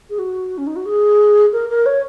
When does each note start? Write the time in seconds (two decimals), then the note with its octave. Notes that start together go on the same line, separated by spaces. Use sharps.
0.10 G#4
0.19 F#4
0.58 C#4
0.67 D#4
0.76 F#4
0.86 G#4
1.53 A#4
1.69 A#4
1.86 C#5